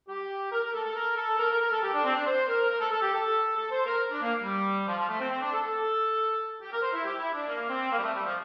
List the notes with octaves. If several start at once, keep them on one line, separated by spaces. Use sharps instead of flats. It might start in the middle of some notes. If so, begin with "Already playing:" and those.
G4
A#4
A#4
A4
A4
A#4
A4
A#4
A#4
A#4
A4
G4
D4
C4
D4
C5
A#4
A#4
A4
A4
G4
A4
A4
C5
A#4
D4
A#3
G3
F3
F3
A3
C4
C4
D4
A4
A4
G4
A#4
C5
E4
G4
E4
D4
A#3
C4
A#3
G3
A3
G3
F3